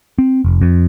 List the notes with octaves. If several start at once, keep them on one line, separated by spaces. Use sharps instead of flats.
C4
F1
F2